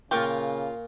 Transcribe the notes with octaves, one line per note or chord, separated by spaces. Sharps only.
A#2 C#3 F4 G5 C#6 D6